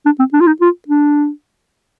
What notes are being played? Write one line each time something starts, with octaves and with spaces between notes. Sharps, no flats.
D4
C4
D4
F4
D#4
F4
D4